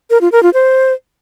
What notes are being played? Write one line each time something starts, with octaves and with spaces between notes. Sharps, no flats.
A#4
F4
A#4
F4
C5